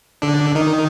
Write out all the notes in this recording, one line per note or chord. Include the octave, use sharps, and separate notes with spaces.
D3 D4
D#3 D#4